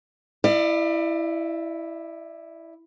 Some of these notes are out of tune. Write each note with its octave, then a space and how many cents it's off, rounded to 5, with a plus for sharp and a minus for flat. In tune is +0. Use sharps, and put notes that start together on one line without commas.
E4 +0 D5 +35 F5 -40